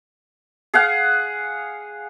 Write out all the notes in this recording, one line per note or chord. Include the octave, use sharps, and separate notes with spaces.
G#4 F5 F#5